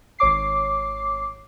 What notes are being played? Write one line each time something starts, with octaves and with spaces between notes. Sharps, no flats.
G#1 C#5 D6 C7